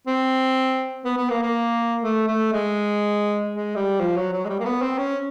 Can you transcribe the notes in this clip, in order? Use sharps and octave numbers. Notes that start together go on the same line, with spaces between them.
C4
B3
B3
A#3
A#3
A3
A3
G#3
G#3
G3
F3
F#3
F#3
G#3
G3
A#3
B3
C4
C#4